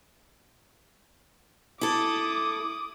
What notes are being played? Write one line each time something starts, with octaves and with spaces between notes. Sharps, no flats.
E4 A4 D6 D#6